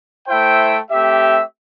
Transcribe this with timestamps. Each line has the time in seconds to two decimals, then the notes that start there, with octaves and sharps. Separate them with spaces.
0.27 A3 E4 C5 E5 G5
0.90 A3 C4 G4 E5